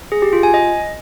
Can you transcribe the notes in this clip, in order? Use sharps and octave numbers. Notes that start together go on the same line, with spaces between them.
G#4
G4
F4
G#5
D#5